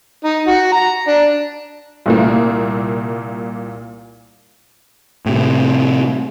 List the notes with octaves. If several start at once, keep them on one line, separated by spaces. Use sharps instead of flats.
D#4
F#4
A#5
D4
C2 A#2 A#3
A2 C3